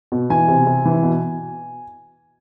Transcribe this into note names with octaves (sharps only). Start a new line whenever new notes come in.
B2
E3 G#5
C3
C3
E3
B2